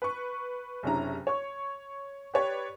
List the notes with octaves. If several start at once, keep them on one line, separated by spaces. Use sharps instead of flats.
B4 C#6
F#1 C3 C#4 D4 E4 A#5
C#5 C#6
G4 B4 C#5 D5